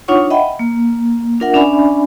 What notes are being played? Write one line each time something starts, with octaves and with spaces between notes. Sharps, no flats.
D4 D#4 F4 C#5 F#5 C#6
D#5 E5 F#5 G5 B5
A#3
D4 F4 A#4 E5 F#5
C#4 D4 D5 E5 G#5 B5